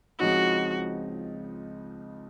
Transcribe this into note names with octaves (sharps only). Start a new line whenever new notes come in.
C#2 C#3 F3 C4 D#4 F#4